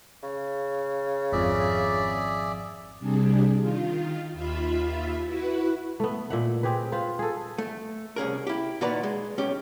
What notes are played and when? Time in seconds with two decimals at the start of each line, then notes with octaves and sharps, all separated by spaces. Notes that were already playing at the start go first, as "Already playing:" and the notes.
0.23 C#3
1.32 G#1 F2 G#4 D5 E5
3.00 C3 G3 D4 G#4
3.59 D#3 F4
4.33 D#2 F4 E5 B5
5.25 E4 F#4 B4
6.00 A3 B3
6.30 A#2 E5 F#5
6.63 C4 G4 G#4 B4
6.92 F4 B4 C5
7.19 G#4 A4
7.58 A3
8.16 C2 C#4 G#4 A#4
8.47 E4 G4
8.81 A#2 D#3 F#4 B4 D5 A#5
9.03 G#3
9.38 B1 C#4 G4